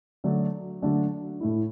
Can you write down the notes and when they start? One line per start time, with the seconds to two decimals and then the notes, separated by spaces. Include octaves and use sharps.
0.24 D3 F#3 A3 D4
0.82 D3 F#3 A3 D4
1.40 A2 A3 E4